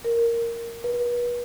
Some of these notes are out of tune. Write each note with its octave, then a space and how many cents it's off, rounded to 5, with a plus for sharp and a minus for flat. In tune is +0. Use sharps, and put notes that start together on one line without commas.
A#4 -5
B4 -40